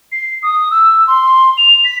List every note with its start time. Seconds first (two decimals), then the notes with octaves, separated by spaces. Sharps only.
0.12 C7
0.43 D#6
0.71 E6
1.07 C6
1.58 F7
1.85 B6